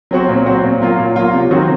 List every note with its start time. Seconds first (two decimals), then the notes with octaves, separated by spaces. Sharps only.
0.11 F#3 C4 F#4
0.29 A#2
0.46 F#3 C4 F#4
0.64 A#2
0.82 F#3 A#3 F4
0.98 A#2
1.16 F#3 A#3 F4
1.33 C3
1.51 D#3 F#3 C4 F#4